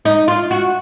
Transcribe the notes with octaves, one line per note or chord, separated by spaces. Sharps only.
D#4
F4
F#4